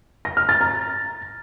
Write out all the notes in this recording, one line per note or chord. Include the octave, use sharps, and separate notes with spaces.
A#6
F6
A6
A#5